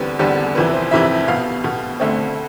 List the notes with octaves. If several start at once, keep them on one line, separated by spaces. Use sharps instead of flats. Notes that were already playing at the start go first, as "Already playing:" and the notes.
Already playing: E2 D3 G3 C4 B4
E2 D3 G3 C4 A4
F2 C3 E3 B4
C5
F2 C3 E3 E5
B2 B3 F5
B2 B3
D2 D3 A3 C4